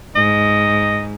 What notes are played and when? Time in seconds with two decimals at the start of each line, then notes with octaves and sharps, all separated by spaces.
0.15 G#2 D#5